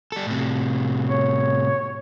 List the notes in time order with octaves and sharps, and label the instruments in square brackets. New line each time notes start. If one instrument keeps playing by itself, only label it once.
[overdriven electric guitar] G3 A4
A2 C3
[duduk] C#5